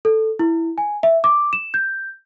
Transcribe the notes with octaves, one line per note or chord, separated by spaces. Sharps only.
A4
E4
G#5
E5
D6
E7
G6